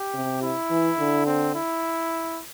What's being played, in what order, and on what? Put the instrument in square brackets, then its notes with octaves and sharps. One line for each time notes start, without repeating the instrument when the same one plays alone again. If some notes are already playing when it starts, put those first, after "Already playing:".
Already playing: [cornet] G4
[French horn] C3
[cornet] E4
[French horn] E3
D3
[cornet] C4
E4